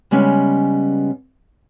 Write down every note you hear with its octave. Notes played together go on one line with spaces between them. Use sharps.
C#3 G3 G#3 B3 C#4